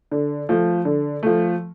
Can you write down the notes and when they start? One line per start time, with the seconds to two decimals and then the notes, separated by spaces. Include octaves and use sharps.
0.11 D3
0.49 F3 A3
0.85 D3
1.23 F3 A3